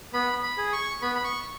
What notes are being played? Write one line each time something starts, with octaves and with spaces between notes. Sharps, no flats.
B3 B5
B5
G#4
C#6
B3 B5
B5
C#6